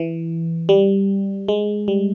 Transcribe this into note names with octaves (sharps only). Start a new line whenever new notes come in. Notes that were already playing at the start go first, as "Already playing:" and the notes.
Already playing: E3
G3
G#3
G3